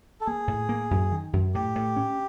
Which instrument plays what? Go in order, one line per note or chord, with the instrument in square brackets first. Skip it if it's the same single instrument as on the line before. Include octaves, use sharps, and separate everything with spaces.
[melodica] A4
[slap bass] A#3 [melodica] G#4
[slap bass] A2
A#3
F#2
D#3
F#2
[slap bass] A2 [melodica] G4
[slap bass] A2
C#4